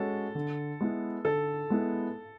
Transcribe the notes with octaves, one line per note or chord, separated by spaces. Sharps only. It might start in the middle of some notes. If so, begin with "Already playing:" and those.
Already playing: G#3 C#4 F#4 A4
D3
G#3 B3 E4
D3 A4
G#3 B3 E4